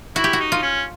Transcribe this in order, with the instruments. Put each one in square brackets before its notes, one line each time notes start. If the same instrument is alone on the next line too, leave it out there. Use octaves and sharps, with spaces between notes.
[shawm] E4 [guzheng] F#4
[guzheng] G4
F#4
[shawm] D#4
[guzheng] F4
[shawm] C#4